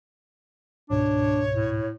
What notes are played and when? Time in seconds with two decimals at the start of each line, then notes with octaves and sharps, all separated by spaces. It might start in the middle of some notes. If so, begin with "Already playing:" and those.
0.90 C#2 G#2 B2 D4 C#5
1.55 A2